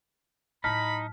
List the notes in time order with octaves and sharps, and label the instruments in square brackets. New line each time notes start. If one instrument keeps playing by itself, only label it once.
[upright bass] A2 F#3 [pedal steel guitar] D#4 [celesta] A5 F6 B6 [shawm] B5